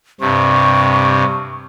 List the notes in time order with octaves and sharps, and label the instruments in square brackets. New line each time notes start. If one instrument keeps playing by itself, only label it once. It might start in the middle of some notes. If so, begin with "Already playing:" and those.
[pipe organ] G2 C3 [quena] C#6